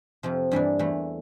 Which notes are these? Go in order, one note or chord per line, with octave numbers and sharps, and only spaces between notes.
F2 C3 F3
G2 E3 A#3 D4
E2 E3 A3